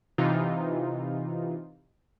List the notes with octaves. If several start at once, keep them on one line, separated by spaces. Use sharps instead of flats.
C3 E3 D#4 F4